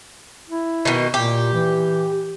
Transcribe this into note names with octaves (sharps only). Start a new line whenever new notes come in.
E4
B2 D#3
A#2 G4
E3